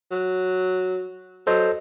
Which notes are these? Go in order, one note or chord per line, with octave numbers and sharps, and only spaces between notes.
F#3
F#3 A4 C5 D#5